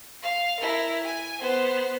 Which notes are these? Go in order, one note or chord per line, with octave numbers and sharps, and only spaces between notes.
F5
E4 A#4
G#5
B3 C5